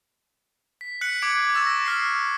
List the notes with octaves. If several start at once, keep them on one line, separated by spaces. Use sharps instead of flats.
B6
F#6 B6 C#7 F#7
D6 G#6 C7 D7
C#6 D6 E6 A6 E7
A#6
D6 F6 C7